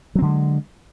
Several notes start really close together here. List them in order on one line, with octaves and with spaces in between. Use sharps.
F#3 C4 D3 G#3